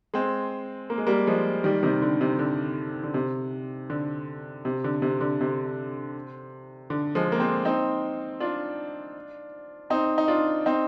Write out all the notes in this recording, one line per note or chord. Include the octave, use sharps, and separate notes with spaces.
G#3 C4
A#3
G#3
G3 A#3
F3 G#3
D#3 G3
C3 D#3
D3
C3
D3
D3
C3
D3
C3
D3
C3
D3
C3
D3
F3 G#3
A#3
G#3 C4
C4 D#4
D4 F4
C4 D#4
D#4
D4 F4
C4 D#4